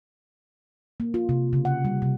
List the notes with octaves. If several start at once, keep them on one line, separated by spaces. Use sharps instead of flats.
A#3
F4
C3
C#3
F#5
G3
C3